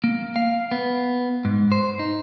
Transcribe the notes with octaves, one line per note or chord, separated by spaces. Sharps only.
A#3
F5
B3
G#2
C5
D#4